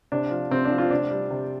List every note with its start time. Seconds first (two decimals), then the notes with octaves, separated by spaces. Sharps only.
0.12 C3 D4
0.31 F3
0.51 C3 C4
0.65 D4
0.70 F3
0.78 F4
0.90 C3 D4
1.11 G3
1.30 C3